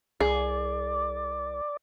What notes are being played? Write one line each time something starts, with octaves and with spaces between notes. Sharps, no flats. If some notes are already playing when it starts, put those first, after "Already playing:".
C2 G#4 D5